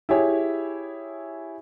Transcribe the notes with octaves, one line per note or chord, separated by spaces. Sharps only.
E4 G4 G#4 C#5